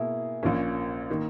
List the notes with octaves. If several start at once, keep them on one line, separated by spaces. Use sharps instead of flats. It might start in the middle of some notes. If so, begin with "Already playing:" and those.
Already playing: B2 A#3 E4 G#4
A#1 A#2 A#3 C#4
D#3 A#3